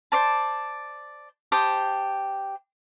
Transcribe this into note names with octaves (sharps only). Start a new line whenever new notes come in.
C5 D5 A5
G4 C5 A5 D#6